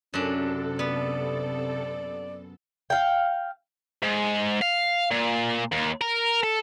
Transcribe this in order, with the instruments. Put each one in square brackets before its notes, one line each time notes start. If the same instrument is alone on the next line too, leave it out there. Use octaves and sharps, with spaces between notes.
[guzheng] F#2 D4 [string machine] C3 A4 [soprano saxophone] C#4
[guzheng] B3 [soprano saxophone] D5
[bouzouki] F5 G5
[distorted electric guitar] G#2
F5
A#2
D#2
A#4
A4